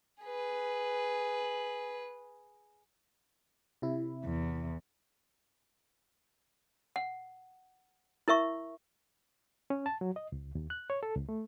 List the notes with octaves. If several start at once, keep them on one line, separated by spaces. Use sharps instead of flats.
G#4 B4
C3 E4
E2
F#5
E4 A#4 E5 C#6
C#4
A5
F#3
D#5
C#2
D#2
F#6
C#5
A4
C#2
A3